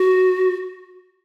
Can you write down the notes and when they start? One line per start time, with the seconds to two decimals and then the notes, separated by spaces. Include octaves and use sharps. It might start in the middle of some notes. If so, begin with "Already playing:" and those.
Already playing: F#4